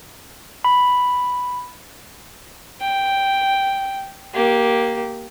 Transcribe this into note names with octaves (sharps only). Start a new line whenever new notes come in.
B5
G5
A#3 G4